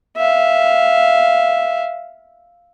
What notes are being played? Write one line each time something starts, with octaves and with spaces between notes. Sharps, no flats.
E5 F5